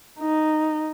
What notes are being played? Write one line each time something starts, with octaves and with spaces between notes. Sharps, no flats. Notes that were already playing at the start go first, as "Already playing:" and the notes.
D#4